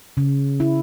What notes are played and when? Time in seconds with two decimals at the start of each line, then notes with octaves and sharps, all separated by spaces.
0.17 C#3
0.60 E4